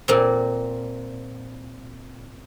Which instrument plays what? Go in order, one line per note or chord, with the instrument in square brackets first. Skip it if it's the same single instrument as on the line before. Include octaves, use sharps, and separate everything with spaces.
[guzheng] A#2 A#3 C4